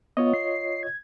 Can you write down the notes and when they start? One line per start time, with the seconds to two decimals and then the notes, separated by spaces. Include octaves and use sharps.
0.17 B3 F4 C#5 D#5
0.34 C7
0.83 G#6